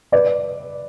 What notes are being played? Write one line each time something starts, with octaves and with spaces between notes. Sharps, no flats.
B4 D5